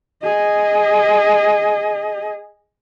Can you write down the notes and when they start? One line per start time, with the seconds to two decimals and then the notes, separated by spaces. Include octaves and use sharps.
0.23 G#4 D#5